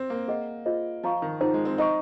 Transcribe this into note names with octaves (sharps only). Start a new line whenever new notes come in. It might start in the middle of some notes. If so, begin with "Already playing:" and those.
Already playing: C4
A#3
G#4 D#5 F#5
F4 G#4 C5 D#5
F3 C5 F5 A#5 C#6
D#3
F3 D#4 G#4 C5 F#5 A#5
G#3
C4
D#4 C5 D#5 A#5 C#6